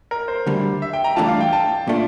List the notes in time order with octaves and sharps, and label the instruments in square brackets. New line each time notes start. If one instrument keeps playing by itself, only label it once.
[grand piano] A#4
C5
[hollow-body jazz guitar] D2 D3 G3
[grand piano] E5
G5
A#5
[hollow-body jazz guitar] G2 E3 A3 D4 F4 [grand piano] A5
[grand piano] F5
G5
A5
[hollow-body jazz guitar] A#2 A3 D4 F4